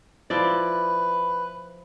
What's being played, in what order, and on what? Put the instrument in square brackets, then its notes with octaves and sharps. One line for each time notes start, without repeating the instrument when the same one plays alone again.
[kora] F3 E4 D5 [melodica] B4